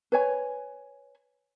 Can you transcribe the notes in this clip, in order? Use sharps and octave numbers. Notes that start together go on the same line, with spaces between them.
B4 C#5 G#5